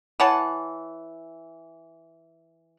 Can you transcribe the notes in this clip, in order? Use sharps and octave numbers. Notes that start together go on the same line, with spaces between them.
E3 C#5 F#5 A5